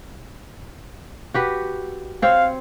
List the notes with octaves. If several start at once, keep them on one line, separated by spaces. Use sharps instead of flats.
F#4 G4 B4
C4 C5 C#5 F5